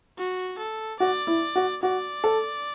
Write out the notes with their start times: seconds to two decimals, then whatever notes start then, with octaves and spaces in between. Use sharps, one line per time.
0.18 F#4
0.58 A4
1.00 F#4 D5
1.27 E4
1.56 F#4
1.83 F#4 D5
2.24 A4